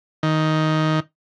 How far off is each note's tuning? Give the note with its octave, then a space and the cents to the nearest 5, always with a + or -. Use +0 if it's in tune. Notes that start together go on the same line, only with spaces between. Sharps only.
D#3 +10